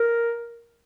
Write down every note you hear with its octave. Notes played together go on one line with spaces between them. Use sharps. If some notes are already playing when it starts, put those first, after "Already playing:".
Already playing: A#4